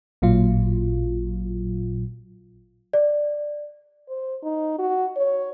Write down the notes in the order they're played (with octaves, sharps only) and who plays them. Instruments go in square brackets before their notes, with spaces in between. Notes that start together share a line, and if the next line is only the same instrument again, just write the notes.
[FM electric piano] A1 A#2 F#3 F4
[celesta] D5
[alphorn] C5
D#4
F#4
C#5